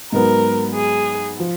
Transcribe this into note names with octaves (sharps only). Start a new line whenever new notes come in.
G#2 F#3 B3 A#4
G#4
F3